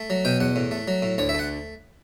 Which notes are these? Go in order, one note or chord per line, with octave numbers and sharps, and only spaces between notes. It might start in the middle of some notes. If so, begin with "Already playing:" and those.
Already playing: A3
F#3
B2 G5
E2 F#5
A2
A3
F#3
A2
D2 C#5
E5
A3 F#5